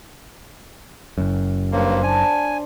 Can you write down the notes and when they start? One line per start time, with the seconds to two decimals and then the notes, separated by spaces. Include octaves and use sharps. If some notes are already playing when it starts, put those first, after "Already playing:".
1.18 F#1 F#2
1.72 G2 A#3 C5 C#5
2.03 D4 G#5